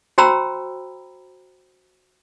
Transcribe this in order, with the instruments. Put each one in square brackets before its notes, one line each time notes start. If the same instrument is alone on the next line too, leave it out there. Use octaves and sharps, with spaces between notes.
[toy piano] F#4 C5 G5 A#5 B5 E6